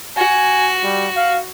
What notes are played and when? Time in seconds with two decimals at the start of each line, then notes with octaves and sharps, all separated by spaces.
0.17 F#4 G#5
0.84 G3
1.17 F5